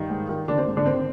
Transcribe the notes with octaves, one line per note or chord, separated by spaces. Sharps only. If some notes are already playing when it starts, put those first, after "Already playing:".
Already playing: G2 D#3 D#4
G#2
D#3
D3 D#3 D4
C4
G#2
D3 D4
D#3 C4